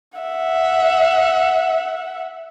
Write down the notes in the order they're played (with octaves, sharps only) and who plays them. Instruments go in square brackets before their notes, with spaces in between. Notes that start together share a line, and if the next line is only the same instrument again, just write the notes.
[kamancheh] E5 F#5